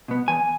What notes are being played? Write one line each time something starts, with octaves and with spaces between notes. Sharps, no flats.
B2 B3
E2 G#5